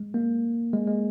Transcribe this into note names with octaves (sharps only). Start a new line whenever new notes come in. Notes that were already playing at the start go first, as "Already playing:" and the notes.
Already playing: G#3
A#3
G#3
G#3